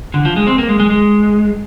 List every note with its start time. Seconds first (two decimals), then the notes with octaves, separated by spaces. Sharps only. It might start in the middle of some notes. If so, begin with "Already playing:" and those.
0.14 D3
0.25 F3
0.36 G#3
0.47 C4
0.58 A#3
0.68 G#3
0.80 G#3
0.90 G#3